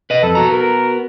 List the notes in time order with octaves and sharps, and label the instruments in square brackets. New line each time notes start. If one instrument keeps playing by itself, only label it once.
[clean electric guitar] B4 D#5
[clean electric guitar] F2 [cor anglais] A4
[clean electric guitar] B3 F#4 A#5
[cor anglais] A#4